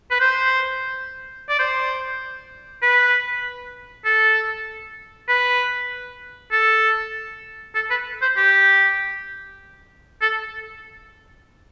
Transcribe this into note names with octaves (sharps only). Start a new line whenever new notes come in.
B4
C5
D5
C5
B4
A4
B4
A4
A4
B4
C5
G4
A4